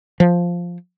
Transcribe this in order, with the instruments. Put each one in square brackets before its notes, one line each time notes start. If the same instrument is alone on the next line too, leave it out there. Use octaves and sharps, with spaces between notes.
[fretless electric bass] F3